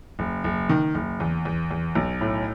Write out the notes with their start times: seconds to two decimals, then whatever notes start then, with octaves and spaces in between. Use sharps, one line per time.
0.19 F#1
0.44 F#1
0.69 D#3
0.95 F#1
1.20 E2
1.45 E2
1.71 E2
1.95 B1
2.21 A2